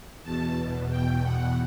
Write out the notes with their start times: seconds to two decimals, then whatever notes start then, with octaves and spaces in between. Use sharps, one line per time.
0.23 E2 B2 A5
0.90 G5
1.23 F#5